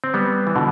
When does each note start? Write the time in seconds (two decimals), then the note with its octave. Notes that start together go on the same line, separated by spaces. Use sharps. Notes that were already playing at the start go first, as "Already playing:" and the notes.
0.04 C4
0.14 G3 B3
0.47 E3
0.55 B2 D3